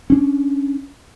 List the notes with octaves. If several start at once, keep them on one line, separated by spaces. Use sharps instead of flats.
C#4 D4